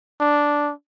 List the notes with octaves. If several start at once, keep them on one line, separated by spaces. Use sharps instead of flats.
D4